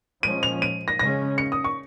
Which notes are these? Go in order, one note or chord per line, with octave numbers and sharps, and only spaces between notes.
A#2 F3 G#3 C#4 D#7
F7
D#7
A#6
C#3 G#3 C#4 A#6
C#7
D#6
C#6